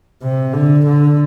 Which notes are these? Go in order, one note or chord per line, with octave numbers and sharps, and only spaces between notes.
C3
D3
D3